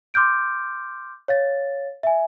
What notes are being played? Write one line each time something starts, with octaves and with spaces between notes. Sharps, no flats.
C6 D6 F6 G6 D7
C#5 F5 A6
E5 G#5